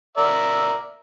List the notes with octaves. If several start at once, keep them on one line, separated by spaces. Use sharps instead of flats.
A#4 D5 E5